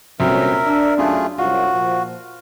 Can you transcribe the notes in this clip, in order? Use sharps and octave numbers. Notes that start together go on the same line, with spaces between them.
C2 A#2 D3 F#3 C4 C#4 A#4 E5
D4 E6
F#2 A3 F4 G#4
C2 F#2 F4 F#4
A#2 F3